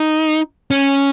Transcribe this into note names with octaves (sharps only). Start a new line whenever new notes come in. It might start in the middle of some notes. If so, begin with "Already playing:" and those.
Already playing: D#4
C#4